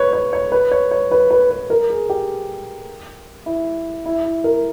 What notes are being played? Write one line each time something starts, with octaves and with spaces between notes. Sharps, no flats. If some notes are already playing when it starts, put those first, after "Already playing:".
Already playing: B4 C#5
C#5
C#5
B4
C#5
C#5
B4
B4
B4
A#4
G#4
G4
E4
E4
E4
A#4